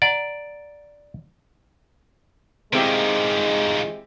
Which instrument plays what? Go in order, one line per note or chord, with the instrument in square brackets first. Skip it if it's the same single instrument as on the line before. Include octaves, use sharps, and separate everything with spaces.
[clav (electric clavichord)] D5 [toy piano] F#5 A#5
[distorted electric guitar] D#3 F3 [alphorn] G#3 [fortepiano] C4 E4 G4